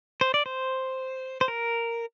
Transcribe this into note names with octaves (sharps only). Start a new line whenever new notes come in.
C5
D5
C5
C5
A#4